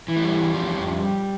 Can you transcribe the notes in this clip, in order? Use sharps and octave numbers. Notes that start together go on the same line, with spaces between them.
E3
A3
G3
E2
F3
F2